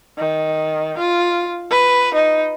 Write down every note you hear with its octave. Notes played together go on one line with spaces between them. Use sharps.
D#3
F4
B4
D#4